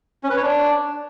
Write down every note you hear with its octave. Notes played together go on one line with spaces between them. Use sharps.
C#4
B4
C#5
D4